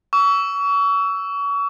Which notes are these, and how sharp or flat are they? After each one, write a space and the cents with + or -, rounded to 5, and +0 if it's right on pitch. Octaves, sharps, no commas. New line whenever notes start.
C#6 +35 E6 +0